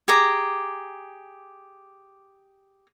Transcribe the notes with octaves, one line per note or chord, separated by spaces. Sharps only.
G4 G#4 A#5 D6